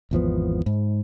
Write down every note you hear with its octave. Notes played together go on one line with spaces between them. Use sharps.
G#1 E2 F3 B3
G#2